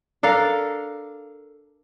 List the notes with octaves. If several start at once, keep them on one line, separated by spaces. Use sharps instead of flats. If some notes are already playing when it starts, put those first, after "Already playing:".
D4 A4 A#4 F5